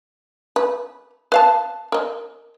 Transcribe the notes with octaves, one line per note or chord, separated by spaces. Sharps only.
B4
B4 F5 A5
A#4 D#5